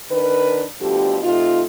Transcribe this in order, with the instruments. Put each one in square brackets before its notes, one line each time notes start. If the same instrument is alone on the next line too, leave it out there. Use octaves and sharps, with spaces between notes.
[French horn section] D#3 D4 A#4 B4
D2 B2 D3 F3 G4
C3 A3 D#4 F4